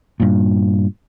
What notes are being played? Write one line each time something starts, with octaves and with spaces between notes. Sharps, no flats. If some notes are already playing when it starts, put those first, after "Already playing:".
G2 A#2